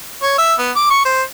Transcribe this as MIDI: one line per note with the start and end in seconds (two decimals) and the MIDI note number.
0.23 0.37 73
0.38 0.54 76
0.59 0.71 59
0.76 0.89 86
0.90 1.03 85
1.05 1.23 72